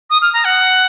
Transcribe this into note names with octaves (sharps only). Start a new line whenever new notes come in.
D#6
F6
A#5
F#5